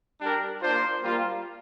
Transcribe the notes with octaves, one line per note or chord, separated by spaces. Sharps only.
G3 D4 G4 A#4
A#3 D4 F4 C5
G3 A#3 F4